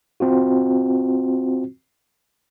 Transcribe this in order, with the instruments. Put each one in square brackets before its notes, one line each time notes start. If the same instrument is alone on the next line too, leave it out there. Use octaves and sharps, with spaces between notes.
[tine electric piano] C4 F4 F#4